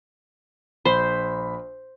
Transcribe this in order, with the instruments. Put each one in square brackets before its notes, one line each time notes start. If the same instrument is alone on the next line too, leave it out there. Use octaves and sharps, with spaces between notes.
[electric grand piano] A#1 B5 [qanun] C5